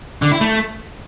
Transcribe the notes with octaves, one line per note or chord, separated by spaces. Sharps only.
D3
E4
A3